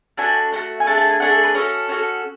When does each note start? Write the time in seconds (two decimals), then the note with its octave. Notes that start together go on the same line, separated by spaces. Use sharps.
0.17 A3 D4 F#4 G#5
0.52 A3 D4 F#4
0.80 G#5
0.86 A3 D4 G#4 A5
0.98 A5
1.09 G#5
1.20 A3 D4 G#4 F#5
1.32 A4
1.43 B4
1.55 C#4 F#4 A4
1.89 C#4 F#4 A4